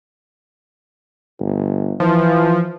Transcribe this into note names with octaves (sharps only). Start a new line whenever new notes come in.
G1
E3 F3